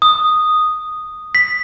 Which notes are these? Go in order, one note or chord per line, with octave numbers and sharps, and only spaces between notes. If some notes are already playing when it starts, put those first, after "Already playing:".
D#6
B6